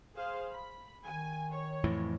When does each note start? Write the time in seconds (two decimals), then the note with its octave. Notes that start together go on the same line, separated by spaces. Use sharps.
0.16 G#4 C5 F5
0.51 B5
1.05 D#3 G#5
1.50 C#5
1.84 F2 A2 E3